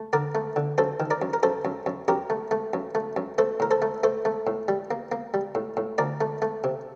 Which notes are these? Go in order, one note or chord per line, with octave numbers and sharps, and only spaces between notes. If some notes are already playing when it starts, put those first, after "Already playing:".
Already playing: A3
D3 A#4 D5
A3
D3
F#2 A4 C5
D#3
A#4 D5
F#2
A#4
F#2 A4 C5
F#2
F#2
F#2 G4 A#4
A3
A3
F#2
A3
F#2
A3 A4 C5
A2 A#4
A4 C5
A3
A3 A4 C5
A3
A2
G3
A#3
A#3
G3
A2
A2
D2 A#4 D5
A3
A3
C3